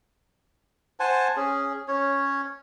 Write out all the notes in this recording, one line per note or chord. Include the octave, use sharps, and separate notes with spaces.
C5 F#5 G#5 A5
C#4 G#4
C#4 C#5